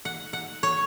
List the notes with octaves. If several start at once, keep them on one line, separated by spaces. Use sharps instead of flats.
F#5
F#5
C#5